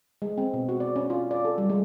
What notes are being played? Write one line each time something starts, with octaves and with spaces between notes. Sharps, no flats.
G#3
C4
B2
F#4
D5
C#4
F4
D5
A4
G3
G#3